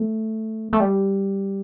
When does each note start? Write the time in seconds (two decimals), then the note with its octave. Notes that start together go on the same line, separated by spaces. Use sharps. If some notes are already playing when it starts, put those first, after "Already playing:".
Already playing: A3
0.73 A3
0.80 G3